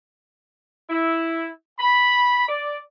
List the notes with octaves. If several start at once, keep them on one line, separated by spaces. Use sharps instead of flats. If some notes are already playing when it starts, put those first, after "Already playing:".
E4
B5
D5